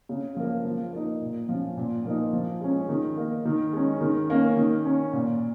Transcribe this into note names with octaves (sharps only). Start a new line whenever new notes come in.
C#3
F3 A#3
F3
A#3 D#4
A#2
F3 C#4
A#2
F3 A#3 D#4
F3
G#3 C#4
D#3
A#3 D#4
D#3
G#3 C#4
D#3
A#3 C#4
D#3
C#4
A#2